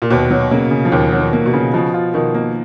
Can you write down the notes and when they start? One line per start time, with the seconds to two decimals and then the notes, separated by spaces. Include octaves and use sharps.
0.02 A#2
0.10 D#2 B2
0.31 F#3
0.51 C#3 A#3
0.71 C#3
0.85 F3
0.92 D#2 D#3
1.12 F#3
1.19 D#3
1.33 A#3
1.46 B2
1.54 C#3
1.74 B2 F3
1.94 F4
2.14 B2 D#3
2.34 A#3